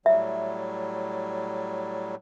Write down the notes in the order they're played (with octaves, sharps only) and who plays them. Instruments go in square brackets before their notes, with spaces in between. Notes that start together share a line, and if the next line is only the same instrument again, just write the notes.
[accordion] A2 F#3 G3 [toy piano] E5